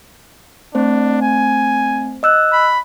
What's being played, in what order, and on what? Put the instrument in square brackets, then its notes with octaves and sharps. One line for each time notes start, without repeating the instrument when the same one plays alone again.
[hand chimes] A3 C4 C5 [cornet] D4
[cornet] G#5
[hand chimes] D#5 E6 F#6
[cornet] B5